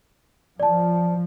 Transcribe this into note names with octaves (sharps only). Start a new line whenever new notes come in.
F3 D5 A5